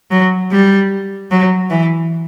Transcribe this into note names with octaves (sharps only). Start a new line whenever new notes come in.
F#3
G3
F#3
E3